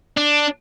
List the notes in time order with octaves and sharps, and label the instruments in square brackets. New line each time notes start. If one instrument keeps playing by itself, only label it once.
[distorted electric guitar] D4